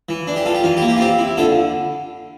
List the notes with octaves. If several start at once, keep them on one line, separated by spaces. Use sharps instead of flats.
E3
D4
G4
F4 A4
G4
E3 F4
G4
A#3
G4
F4
C4 G4
E4
D3 F4 A4